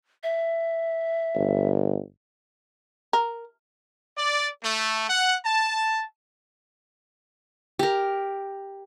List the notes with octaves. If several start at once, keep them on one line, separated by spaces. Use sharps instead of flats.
E5
G1
A#4
D5
A3
F#5
A5
G4 A#4